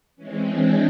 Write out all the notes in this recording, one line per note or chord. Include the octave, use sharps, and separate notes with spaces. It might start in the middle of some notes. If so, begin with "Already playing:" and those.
E3 G#3 C4 C#4
D4